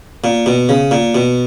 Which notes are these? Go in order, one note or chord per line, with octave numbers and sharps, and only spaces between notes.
A#2
B2
C#3
A#2
B2